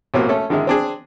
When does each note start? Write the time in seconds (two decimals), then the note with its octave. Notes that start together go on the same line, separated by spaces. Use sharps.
0.14 B1 A2 A#3 C4 F#4 G4
0.29 A3 C#4 A4
0.50 D3 D#3 G#3 E4
0.67 C4 D4 G#4